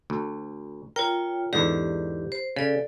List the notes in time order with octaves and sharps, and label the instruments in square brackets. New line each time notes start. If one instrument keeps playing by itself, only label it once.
[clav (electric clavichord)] D2
[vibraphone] F4 C#5 G5 [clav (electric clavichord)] A#4
[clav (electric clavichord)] E2 G#2 D3 [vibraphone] G4
[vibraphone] C5
[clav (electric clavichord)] C#3 [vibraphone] A4 D5